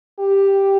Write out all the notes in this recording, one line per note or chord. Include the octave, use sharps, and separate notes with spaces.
G4